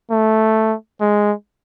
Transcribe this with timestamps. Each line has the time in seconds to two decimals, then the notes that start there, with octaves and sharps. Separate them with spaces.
0.11 A3
1.01 G#3